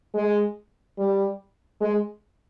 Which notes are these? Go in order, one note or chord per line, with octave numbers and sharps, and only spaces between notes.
G#3
G3
G#3